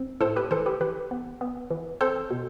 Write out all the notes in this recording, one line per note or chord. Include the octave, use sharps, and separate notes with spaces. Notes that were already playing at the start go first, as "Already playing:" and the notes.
Already playing: C4
A2 A4 C5
G4 B4
E3 A4 C5
G4 B4
E3 G4 B4
B3
B3
E3
C4 A4 C5
B2